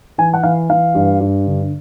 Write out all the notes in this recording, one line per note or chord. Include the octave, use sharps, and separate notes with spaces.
E3 G#5
F#5
E3 F5
E3 F5
G2
G2
D3